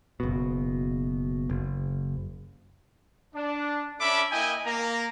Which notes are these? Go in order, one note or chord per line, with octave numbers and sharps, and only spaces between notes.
F#1 B2
F#1
D4
C#4 D4 A4 E5 B5 D6
A#3 E4 D#5 G5 G#5
A#3 A#5